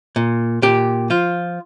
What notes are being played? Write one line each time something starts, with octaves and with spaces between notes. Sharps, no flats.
A#2
A#2 G4
F3 F4